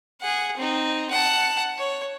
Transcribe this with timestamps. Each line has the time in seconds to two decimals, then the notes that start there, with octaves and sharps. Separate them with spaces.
0.21 G#4 F#5
0.57 C4 D#4
1.11 F#5 A5
1.79 C#5